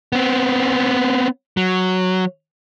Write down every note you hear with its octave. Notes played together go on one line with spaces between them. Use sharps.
B3 C4
F#3